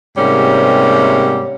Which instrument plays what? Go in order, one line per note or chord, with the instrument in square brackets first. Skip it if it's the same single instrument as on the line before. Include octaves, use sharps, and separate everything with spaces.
[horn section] G#2 C3 G3 A#3 C#4